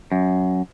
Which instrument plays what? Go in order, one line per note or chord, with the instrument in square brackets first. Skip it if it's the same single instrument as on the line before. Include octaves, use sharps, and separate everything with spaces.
[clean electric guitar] F#2